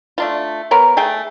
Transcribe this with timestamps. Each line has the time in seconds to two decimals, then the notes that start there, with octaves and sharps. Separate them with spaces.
0.18 A3 D4 F4
0.71 B3 A#4 C#5
0.97 A3 G#4 G5